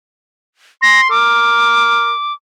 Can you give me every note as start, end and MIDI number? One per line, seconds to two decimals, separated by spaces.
0.82 1.06 84
0.82 1.01 94
1.10 2.11 70
1.10 2.33 86